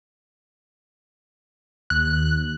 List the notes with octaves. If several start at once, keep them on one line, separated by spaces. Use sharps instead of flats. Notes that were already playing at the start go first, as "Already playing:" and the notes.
D#2 F#6